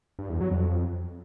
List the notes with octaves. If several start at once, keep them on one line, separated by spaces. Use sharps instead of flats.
G2
E2
F#3
F2